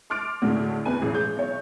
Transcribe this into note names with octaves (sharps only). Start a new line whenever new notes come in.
C6 D6 F6 A6 D7
D2 A2 D3 G#3 A3
E2 B4 G#5 D#7
A1 E3 G#4
G#3 G6
B1 C#5